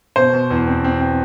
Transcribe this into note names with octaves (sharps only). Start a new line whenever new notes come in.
B2 C5
B2
E2
C4
C4
C4